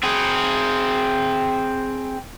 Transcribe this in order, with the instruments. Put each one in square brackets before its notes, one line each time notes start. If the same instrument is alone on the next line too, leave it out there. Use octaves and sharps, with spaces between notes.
[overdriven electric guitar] C4 G#4